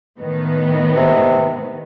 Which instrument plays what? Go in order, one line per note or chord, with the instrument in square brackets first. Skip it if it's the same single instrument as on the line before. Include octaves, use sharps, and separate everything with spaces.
[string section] A2 D#3 B3
[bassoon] C3